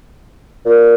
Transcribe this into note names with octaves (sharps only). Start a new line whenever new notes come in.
A#2